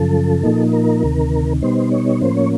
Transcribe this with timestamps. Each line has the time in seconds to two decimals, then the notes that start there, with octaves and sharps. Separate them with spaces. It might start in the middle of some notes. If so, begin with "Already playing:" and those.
Already playing: F#2 C#3 F3 A4
0.43 A#2 F3 A#3 D#4
0.73 A#4
1.03 D2 C3 D#3
1.62 B2 G3 B3 D#4 C5
1.92 C#5
2.21 A2 F3 A#3 C#4 C5
2.37 C#5